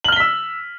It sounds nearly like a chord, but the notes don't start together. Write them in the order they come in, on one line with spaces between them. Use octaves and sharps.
F#7 F6 G7 B6 E6